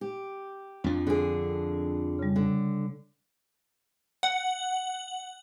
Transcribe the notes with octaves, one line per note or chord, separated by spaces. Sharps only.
G4
F2 F3 D4
D3 G#4
C#3 G3
D3
F#5